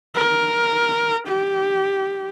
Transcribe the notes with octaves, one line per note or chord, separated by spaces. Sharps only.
A#4
G4